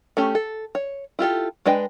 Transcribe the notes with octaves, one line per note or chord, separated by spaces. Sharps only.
A3 C#4 G4
A4
C#5
E4 F4 G4 A4
G#3 D4 B4 D#5 G5